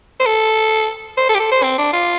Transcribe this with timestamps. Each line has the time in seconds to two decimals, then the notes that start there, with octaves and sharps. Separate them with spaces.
0.20 C5
0.26 A4
1.18 C5
1.29 A4
1.35 G4
1.40 A4
1.52 C5
1.63 C4
1.78 D4
1.93 F4